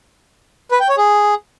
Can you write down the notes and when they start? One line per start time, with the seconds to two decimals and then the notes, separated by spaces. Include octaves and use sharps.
0.71 B4
0.80 G5
0.89 C#5
0.97 G#4